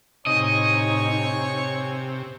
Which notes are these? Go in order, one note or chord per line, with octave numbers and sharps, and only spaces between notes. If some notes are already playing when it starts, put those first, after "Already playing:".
A2 C3 D#4 C#5 D#5 G#5 C#6